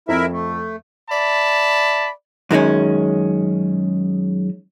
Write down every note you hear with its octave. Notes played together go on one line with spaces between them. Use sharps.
F2 E4 A#4 E5
A3
D5 E5 A5 B5
F#2 D#3 G#3 C#4